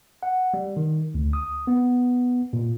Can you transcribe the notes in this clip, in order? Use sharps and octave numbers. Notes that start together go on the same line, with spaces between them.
F#5
G3
D#3
D2
D#6
B3
A#2